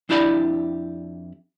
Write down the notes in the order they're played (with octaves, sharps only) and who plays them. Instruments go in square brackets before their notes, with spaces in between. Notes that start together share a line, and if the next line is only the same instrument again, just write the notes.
[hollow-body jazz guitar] F2 D4 E4 G4 D5 B5